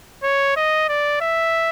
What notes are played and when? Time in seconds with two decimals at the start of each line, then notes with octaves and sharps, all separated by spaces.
0.23 C#5
0.56 D#5
0.89 D5
1.21 E5